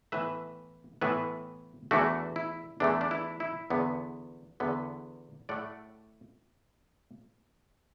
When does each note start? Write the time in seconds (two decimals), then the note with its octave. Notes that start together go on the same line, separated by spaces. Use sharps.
0.12 A2 E3 B3 B4 E5
1.01 A2 E3 B3 B4 E5
1.91 E2 E3 A3 D4 F#4
2.36 E4
2.80 E2 E3 A3 D4
3.01 D4
3.11 E4
3.40 E4
3.70 E2 D3 B3
4.60 E2 D3 B3
5.49 A2 A3 D5 F#5